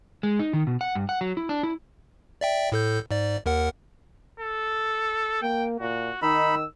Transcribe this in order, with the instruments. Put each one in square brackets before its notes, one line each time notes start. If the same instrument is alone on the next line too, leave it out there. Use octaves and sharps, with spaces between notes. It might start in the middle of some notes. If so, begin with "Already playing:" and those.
[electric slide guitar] G#3
D#4
D#3
B2
F#5
G2
F#5
F#3
E4
D4
E4
[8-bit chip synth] D5 E5 G5
A2 A4 G6
G#2 D5
D#2 A#4 F#5
[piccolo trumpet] A4
[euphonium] A#3 [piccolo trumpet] G5
[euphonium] A#2 [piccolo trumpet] F#4
[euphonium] D#3 [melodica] D#4 B5 [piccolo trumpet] E6